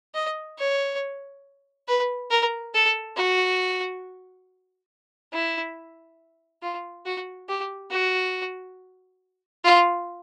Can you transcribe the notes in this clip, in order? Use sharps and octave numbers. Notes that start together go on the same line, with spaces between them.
D#5
C#5
B4
A#4
A4
F#4
E4
F4
F#4
G4
F#4
F4